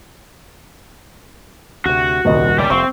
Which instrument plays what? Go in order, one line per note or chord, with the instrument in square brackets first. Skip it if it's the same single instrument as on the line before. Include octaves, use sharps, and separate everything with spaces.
[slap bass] D2 C3 [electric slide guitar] F#4
[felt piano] D#1 D#5 [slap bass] C2 C3
[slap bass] C#2 B2 [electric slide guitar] G4 D5
[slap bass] F1 [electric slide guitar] C4 [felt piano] C#6